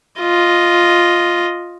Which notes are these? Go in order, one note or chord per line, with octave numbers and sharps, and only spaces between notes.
F4 D#5